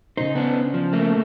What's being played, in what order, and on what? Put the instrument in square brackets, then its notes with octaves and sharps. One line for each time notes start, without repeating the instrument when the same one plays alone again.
[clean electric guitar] C#3 C5 [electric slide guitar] D#4
[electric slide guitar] B3 D4
F3
A3 A#3